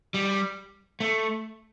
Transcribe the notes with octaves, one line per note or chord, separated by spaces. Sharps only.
G3
A3